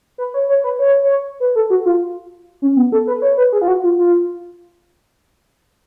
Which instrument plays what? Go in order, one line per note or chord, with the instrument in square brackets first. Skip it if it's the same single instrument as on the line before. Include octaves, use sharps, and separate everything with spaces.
[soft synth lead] B4
C#5
C#5
B4
C#5
C#5
B4
A4
F#4
F4
C#4
B3
A4
B4
C#5
B4
G#4
F4
F#4
F4
F4